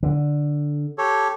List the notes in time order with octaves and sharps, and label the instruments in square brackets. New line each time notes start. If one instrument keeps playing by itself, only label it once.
[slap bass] D3
[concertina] G4 A4 C#5